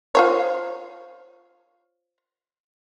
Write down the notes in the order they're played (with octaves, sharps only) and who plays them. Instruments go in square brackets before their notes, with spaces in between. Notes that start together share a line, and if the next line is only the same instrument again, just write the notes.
[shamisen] F4 C5 C#5